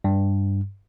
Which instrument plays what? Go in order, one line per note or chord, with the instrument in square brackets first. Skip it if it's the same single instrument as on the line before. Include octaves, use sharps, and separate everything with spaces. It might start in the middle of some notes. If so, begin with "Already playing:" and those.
[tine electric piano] G2